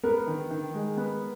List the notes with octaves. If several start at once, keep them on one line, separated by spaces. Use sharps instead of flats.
B3 A#4
D#3
D#3
G#3
B3